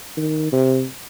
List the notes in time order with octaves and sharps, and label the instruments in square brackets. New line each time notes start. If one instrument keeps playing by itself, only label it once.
[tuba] D#3
C3